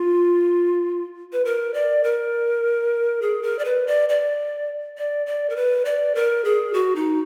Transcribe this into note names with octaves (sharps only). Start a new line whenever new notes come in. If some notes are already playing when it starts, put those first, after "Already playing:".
Already playing: F4
B4
A#4
D5
A#4
G#4
A#4
D5
B4
D5
D5
D5
D5
A#4
B4
D5
A#4
G#4
F#4
D#4